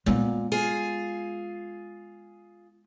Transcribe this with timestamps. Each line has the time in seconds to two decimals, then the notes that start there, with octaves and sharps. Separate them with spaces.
0.06 A#2 G#3 B3
0.52 F4 G#4